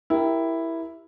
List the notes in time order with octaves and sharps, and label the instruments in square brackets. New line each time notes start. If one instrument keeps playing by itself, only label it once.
[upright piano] E4 G4 A#4